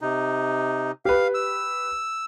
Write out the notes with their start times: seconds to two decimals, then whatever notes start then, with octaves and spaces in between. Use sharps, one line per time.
0.01 C3 D#4
1.05 G4 B4 F5
1.35 E6